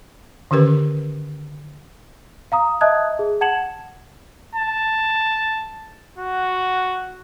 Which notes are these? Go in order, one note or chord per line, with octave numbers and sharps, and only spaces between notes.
D3 D#3 C#4 G4 A#4 B4
F5 A#5 D#6
D#5 E5 A5 D#6 F#6 G#6
G#4
F#5 A5 G#6 C#7 E7 F#7
A5
F#4